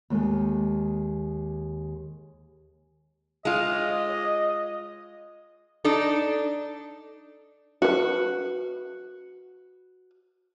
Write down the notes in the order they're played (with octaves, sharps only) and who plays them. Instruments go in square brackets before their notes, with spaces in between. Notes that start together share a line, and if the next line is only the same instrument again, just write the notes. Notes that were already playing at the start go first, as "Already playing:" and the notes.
[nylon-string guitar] D#2 G#3 A4
[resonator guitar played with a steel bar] G#3 F4 [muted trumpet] D#5
[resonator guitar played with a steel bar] D4 D#4 A4
[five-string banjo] F#4 B4